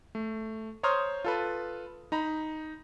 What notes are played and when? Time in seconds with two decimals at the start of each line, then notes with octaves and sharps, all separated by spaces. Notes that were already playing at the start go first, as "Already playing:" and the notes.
0.15 A3
0.83 C5 C#5 A#5 C6 D#6 F6
1.25 F4 A4 B4
2.12 D#4 A#5 B5